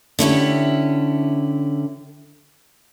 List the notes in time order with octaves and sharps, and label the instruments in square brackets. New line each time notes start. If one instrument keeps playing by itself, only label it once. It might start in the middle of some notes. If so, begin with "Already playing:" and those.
[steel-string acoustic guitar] D3 C#4 E4 G4